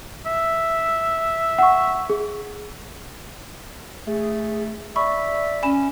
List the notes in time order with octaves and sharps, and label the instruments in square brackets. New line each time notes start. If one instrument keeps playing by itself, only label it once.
[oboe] E5
[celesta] F#5 C#6
G#4
[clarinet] A3 [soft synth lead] G#4
[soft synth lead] D5 [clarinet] E5 [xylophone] B5 C#6
[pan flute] C#4 [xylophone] G#5 B5 E7